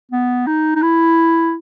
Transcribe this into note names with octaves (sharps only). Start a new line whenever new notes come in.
B3
D#4
D#4
E4